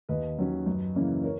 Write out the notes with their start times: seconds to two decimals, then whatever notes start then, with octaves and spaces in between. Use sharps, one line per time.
0.09 D#2 B4 D#5
0.38 D#3 F#3 C#4
0.66 F#2
0.96 C#3 E3 A#3 C#4
1.24 A#4 C#5